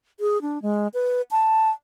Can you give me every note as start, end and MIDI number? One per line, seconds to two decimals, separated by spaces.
0.20 0.41 68
0.42 0.61 62
0.62 0.88 56
0.94 1.22 71
1.31 1.70 81